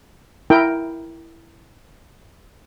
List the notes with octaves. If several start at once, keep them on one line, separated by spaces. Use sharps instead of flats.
E4 A#4 G5